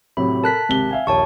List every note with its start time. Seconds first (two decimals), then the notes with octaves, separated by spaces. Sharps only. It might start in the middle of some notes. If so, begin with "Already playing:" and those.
0.17 A2 C3 F#3 B5
0.44 A4 A#4 A5 F#6 B6
0.69 G#1 C3 G7
0.91 E5 F5 G#5
1.07 A#1 D#2 C#5 E5 A5 C#6